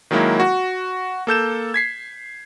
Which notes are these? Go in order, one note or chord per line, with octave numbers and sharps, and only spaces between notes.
D#3 F#3 G#3 A#3 E4
F#4
A#3 A4 G6 E7
G#6 B6 C7